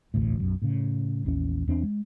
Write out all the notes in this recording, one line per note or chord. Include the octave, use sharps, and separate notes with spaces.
E1 A1 D2 A2
B1 F#2 F#3
A2 C#3
A#1 E2 C4 C#4
E2 C4 D4
G#3